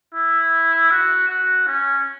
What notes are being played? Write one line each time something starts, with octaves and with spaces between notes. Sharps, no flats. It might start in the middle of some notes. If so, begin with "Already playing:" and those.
E4
F#4
F#4
C#4